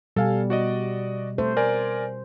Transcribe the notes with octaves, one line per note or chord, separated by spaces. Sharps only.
B2 G3 A4 F5 G#5
F#4 D5 D#5
A3 C5
A#4 D5 G#5